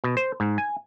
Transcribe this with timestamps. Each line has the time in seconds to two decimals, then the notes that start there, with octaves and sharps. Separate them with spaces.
0.04 B2
0.17 C5
0.40 G#2
0.58 G#5